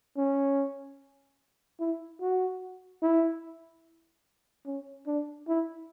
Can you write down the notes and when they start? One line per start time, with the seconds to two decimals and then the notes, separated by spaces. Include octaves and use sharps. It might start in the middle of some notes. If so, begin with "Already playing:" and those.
0.17 C#4
1.80 E4
2.21 F#4
3.02 E4
4.66 C#4
5.07 D4
5.48 E4